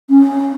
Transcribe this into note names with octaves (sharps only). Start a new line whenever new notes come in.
C#4